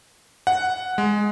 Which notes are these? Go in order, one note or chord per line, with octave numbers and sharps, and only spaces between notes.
F#5
G#3